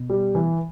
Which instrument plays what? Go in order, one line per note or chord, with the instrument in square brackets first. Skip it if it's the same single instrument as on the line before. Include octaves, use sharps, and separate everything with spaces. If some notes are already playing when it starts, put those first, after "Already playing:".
Already playing: [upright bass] B2
[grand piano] G3
E3